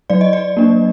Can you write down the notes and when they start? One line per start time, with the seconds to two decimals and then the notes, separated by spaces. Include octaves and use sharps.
0.10 F#3 D5
0.21 D#5
0.33 D5
0.57 A#3 D4